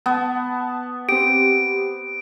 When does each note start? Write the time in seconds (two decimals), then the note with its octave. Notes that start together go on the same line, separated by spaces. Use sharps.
0.06 B3 A5
1.09 C4 G4 D7